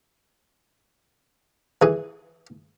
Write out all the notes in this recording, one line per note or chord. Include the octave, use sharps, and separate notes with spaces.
E3 G#4